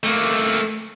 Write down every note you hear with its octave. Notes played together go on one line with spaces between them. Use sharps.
A3 A#3